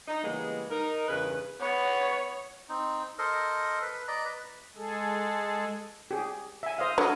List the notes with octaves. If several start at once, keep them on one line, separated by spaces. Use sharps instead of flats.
D#4
C#3 E3 G3 G#3 A#3 B3
D#4 A#4
E2 G2 C#3 B4
B3 C#5
C4 D#4
A4 A#4 C5 D#5
B4
D5 D#5 A#5
B4
G#3 G#4 A4
G4 G#4
E5 G#5
C5 D#5 F5
D3 F#3 A#4 B4 D#5